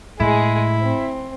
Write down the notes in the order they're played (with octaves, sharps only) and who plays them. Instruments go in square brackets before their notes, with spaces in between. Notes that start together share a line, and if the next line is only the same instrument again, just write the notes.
[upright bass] A2 [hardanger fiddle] G#3 G#4 [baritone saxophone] E4
[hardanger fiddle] C4